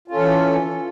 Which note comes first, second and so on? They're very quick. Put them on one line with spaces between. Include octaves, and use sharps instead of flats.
F4 C#4 A4 E3